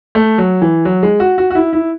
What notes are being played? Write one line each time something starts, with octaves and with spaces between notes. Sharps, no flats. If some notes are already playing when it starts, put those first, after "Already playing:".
A3
F#3
E3
F#3
G#3
F#4
F#4
F#4
E4
E4